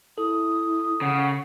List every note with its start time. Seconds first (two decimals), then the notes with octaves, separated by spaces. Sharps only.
0.18 E4 A4 D#6
1.01 C#3 F#5